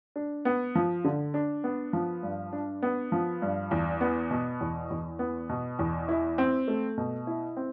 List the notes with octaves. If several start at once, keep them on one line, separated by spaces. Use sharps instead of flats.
D4
B3
F3
D3
D4
B3
F3
G2
D4
B3
F3
G2
E2
B3
B2
E2
E2
B3
B2
E2
E4
C4
A3
B2
E4
C4